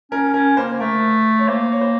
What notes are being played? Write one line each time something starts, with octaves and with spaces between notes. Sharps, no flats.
C#4 A#4
C#4 A#4
A#3 C5
A3 A#4
C#5
A#3 C5
C#5
C5